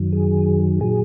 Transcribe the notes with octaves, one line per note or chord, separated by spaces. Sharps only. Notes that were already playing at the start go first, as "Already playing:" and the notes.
Already playing: F#2 D#3 F#3
G#4
A#2 F#3 G#4